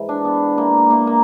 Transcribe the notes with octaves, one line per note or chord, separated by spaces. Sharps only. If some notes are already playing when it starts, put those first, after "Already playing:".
Already playing: G#2 E3
D4
B3
A#3
A#3
A#3